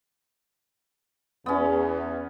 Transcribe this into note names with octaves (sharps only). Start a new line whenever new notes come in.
E2 B3 C#4